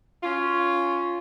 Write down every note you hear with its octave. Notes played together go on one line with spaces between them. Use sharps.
C#4 F4